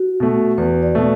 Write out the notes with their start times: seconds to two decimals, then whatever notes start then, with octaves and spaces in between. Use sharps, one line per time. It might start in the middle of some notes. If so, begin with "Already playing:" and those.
Already playing: F#4
0.20 B2 A3
0.58 E2 B4
0.83 D5
0.95 B2 A3